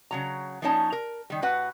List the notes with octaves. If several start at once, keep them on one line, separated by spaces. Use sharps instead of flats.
C#3 F#3 A#5
F3 A#3 C#4 D#4 C#5 A5
A#4
D#3 G3
A2 F#4 B4 F#5